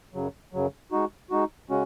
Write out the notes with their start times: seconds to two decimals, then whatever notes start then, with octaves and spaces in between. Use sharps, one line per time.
0.14 F#2 C#3 F#3
0.53 F#2 C#3 F#3
0.92 G#3 D#4 F#4
1.30 G#3 D#4 F#4
1.70 C#3 G#3 C#4 F#4